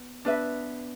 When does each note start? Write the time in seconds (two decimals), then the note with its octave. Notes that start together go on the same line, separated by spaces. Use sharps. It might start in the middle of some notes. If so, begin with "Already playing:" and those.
Already playing: B3
0.25 B3 D4 B4 E5